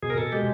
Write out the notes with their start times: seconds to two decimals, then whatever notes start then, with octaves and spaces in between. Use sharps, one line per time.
0.03 B2 G#4
0.10 A#4
0.18 B2 A4
0.32 G#3 G4